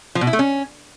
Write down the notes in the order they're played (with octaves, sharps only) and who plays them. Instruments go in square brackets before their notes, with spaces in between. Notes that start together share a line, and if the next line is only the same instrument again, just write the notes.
[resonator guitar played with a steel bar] F3
B2
E4
A3
C#4